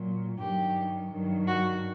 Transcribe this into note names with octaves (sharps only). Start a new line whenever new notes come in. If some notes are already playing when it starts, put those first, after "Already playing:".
Already playing: A#2 F#3
G2 D#3 F#3 G4
G2 D#3 F#3
F#4